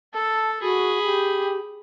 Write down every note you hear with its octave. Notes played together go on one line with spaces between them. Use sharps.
A4 A5
F#4 G#4 B5
G4